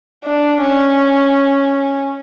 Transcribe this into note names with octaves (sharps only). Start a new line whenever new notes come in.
D4
C#4